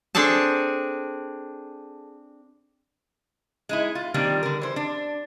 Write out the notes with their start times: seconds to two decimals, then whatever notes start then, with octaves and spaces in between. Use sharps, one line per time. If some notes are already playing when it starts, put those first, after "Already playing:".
0.15 C4 D4 G#4 A4 A5
3.69 G#3 D#4 E4
3.95 F4
4.14 D#3 F3 G3 A#3 C4 D4
4.43 D3 A#4
4.61 E3 C5
4.76 D4